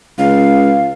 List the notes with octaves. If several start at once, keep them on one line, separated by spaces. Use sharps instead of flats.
C#2 F5